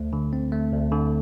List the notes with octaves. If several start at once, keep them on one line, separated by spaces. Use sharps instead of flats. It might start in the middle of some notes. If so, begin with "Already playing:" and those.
Already playing: D2 A3
D3
C4
A3
D2
D3